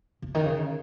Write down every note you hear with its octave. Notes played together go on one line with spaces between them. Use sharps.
C#3
D#3
C#3